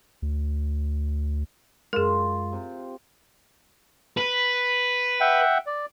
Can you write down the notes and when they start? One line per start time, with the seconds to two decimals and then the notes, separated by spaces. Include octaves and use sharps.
0.22 D2
1.93 F#2 G#3 F4 G#4 A#4
2.52 C3
4.18 B4
5.20 E5 F#5 G5
5.66 D5